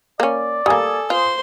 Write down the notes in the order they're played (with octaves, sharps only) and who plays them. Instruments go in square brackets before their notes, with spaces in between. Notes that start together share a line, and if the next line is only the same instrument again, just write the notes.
[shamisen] A#3 C#4 [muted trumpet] D5
[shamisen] G3 A#3 [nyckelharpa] A4 [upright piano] G#5 D#6
[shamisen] F4 [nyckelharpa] C5 C6